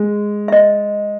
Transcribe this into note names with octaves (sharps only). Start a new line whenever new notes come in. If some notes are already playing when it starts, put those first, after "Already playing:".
Already playing: G#3
E5
D#5